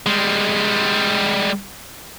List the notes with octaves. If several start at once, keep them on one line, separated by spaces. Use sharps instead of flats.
G3 G#3